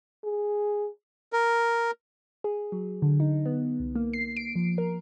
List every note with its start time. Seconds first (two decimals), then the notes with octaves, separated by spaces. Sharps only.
0.24 G#4
1.33 A#4
2.44 G#4
2.72 F#3
3.02 D3
3.20 D#4
3.46 B3
3.79 C2
3.95 A#3
4.13 C7
4.36 D7
4.55 F3
4.78 A#4